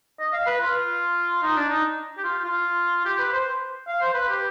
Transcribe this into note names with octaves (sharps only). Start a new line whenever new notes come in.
D#5
F5
B4
F4
D#4
D4
D#4
G4
F4
F4
G4
B4
C5
F5
C5
B4
G4